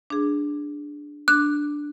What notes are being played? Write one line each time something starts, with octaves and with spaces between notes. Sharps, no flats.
D4 G#4
D4 F#6